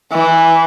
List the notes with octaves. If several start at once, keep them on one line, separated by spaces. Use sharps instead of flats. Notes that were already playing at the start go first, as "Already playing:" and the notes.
E3